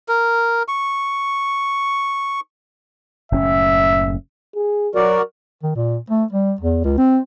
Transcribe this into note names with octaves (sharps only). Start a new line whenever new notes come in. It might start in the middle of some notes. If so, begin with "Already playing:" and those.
A#4
C#6
F#1 A2 C#4 E5
G#4
F#3 F#4 A#4 D5
D#3
A#2
A3
G3
E2
C#2
C4